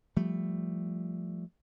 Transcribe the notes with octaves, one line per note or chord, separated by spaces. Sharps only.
F3 G3 A3